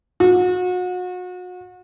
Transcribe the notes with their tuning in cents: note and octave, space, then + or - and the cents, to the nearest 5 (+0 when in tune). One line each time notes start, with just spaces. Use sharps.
F#4 -35